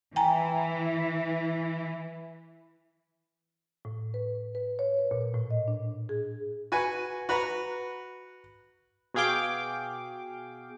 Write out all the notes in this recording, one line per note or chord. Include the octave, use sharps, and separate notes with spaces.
E3 G5 G#5 A#5
A2
B4
B4
C#5
B4
A#2
A2
D#5
D4
G#4
F#4 B4 G#5
F#4 B4 A#5
B2 F#4 G#4 F5 G5 D6